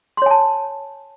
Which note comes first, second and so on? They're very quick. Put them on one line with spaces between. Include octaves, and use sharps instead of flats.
C6 C#5 G#5 A5